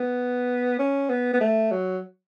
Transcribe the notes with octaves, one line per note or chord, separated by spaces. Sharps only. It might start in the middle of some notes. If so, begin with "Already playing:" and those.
Already playing: B3
C#4
B3
B3
A3
F#3